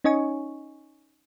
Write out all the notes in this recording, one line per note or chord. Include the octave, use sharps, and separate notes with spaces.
C#4 D#4 C#5 D#5 G#5 C#6